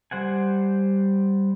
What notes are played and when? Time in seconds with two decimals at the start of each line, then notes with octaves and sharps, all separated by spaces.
0.11 G3 C5 F#5 G#5